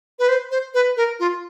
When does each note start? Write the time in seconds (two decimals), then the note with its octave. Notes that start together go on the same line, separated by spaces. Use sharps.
0.19 B4
0.29 C5
0.51 C5
0.74 B4
0.97 A#4
1.20 F4